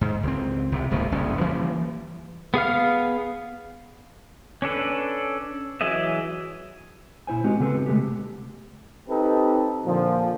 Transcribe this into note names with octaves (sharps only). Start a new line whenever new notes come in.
G#2
C#2 C4
C2 C3
D#1 G#2 B2 A#3
F#1 C2 F2 C#4
E3 F3 G3 A#3
B3 G#4 F5 F6
C#4 D4 A4 B4
E3 F#3 G#4 D#5 E5
A#2 E4 C5 G#5
G#3 B3 C4 D#4 F#4 G4
C#3 B3 C4 G#4 A4 B4
C3 G#3 A3 B3 G4
C4 D#4 G4 A4 B4
A#2 D3 F3